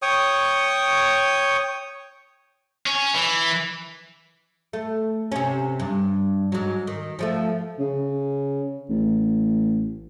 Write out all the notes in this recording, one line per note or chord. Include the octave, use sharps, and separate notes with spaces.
C#5 G5 C#6 D#6
C#4
E3
A3
C3 C#4
G2
G#2 F#3
D#3
F3 G3 A3
C#3
A1